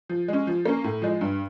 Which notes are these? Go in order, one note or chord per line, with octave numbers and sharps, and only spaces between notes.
F3
G#3 C#4
F3
A#3 C#4
A2
F3 G#3
G2